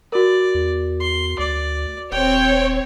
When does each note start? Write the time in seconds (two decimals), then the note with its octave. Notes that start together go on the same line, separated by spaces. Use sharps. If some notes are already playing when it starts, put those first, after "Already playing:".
0.12 F#4 A#4 D5
0.55 E2
1.00 C6
1.39 D2 D5
2.12 D#1 C4 C#5 G5